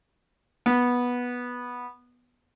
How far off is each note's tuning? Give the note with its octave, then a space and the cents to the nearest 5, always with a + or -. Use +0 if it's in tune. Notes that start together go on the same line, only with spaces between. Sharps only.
B3 -10